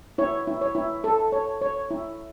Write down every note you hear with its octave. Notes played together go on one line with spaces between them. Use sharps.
E4 C#5
E4
C#5
E4
A4
C#5
C#5
E4